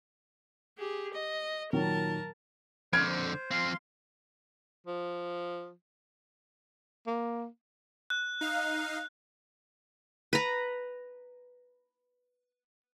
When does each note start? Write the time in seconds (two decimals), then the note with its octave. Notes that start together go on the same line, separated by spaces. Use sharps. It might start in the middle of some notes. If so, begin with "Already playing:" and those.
0.78 G4 G#4
1.14 D#5
1.73 A#2 D#3 F#3 A#4 A5
2.93 F2 D3 C5 F6 G#6 D7
3.51 F3 C4 F5 C6
4.87 F3
7.07 A#3
8.10 F#6
8.41 D#4 F5
10.33 B4 A#5